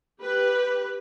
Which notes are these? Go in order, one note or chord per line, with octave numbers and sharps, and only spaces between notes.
G4 B4